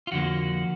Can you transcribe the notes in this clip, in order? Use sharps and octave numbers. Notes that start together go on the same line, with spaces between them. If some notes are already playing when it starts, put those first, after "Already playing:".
F4
F2 D3 F3 A#3 F#4